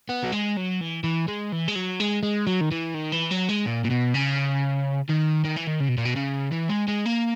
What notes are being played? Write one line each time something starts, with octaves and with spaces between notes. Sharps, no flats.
B3
F#3
G#3
F#3
E3
E3
G#3
E3
G#3
F#3
G#3
G#3
F#3
D#3
E3
D#3
E3
F#3
G#3
A#2
A#2
B2
C#3
D#3
D#3
E3
D#3
C#3
B2
A#2
B2
C#3
E3
G#3
G#3
A#3